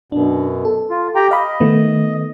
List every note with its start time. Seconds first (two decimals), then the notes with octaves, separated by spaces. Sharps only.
0.12 F#2 B2 D4
0.65 A4
0.90 F4
1.15 G4 G5 A#5
1.31 D#5 F5 B5
1.60 D#3 A3 B3